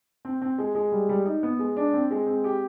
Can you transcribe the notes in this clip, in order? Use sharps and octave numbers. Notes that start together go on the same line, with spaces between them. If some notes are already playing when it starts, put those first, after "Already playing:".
C4
C4
G#3
G#3
G3
G3
D#4
B3
G#3
D4
C4
G#3
C4
G4